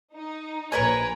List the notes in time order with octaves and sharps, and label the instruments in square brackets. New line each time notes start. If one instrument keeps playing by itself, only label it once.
[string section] D#4
[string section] A#1 A#5 [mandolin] A#4 B4 G#5 [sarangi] C#5